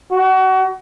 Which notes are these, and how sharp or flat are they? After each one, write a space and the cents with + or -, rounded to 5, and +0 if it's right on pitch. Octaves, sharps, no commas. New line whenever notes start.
F#4 +30